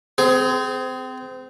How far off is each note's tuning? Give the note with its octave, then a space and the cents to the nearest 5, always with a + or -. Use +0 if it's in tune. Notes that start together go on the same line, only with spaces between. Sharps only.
C4 -25 G#4 +20